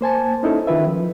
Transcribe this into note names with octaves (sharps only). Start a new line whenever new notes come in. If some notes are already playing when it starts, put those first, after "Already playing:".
A#3 C5 G#5 A5
C#4 D#4 E4 A4
D#3 F4 B4 E5
F3